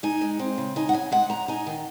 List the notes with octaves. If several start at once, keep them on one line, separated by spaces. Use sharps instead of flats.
D#4 G#5
G#3
C4
C#3
D#4 G#5
F#5
C#3 G#5
G#3 F#5
F#2 A#5
D#4 G#5
D#3